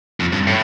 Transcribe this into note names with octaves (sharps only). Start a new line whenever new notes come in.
F2
G2
A2